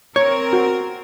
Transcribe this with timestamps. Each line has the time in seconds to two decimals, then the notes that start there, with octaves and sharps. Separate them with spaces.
0.16 C4 A#4 C#5
0.53 F#4